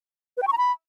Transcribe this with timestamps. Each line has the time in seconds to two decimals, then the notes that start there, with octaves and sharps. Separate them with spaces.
0.37 B4
0.42 G5
0.47 C#6
0.53 A#5
0.58 B5